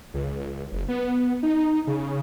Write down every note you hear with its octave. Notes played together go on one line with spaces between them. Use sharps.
C#2
F#1
B3
D#4
C#3